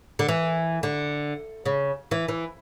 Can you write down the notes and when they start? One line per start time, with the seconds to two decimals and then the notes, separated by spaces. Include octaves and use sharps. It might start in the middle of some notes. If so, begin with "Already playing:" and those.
0.19 D3
0.29 E3
0.83 D3
1.66 C#3
2.11 E3
2.28 E3